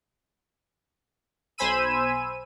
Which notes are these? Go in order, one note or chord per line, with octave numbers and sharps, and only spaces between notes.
B1 C5 G#5 B5 E6 D#7